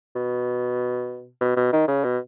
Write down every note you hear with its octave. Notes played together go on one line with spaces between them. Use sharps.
B2
B2
B2
D#3
C#3
B2